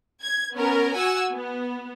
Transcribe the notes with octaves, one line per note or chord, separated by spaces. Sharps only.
G#6
B3 C#4 A#4
F#4 F#5 G#5 E6
B3